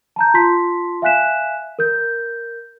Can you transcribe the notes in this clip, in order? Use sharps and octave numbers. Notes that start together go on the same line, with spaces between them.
A5 A#5 G6
F4 A5 C6 B6
E5 F5 G#5 F#6 B6 E7
A#4 G6